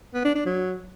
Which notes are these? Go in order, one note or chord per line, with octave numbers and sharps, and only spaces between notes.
B3
D4
D4
F#3